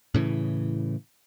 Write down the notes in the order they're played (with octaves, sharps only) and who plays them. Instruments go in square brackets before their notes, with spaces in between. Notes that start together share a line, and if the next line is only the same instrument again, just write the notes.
[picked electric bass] A2 C#3 E3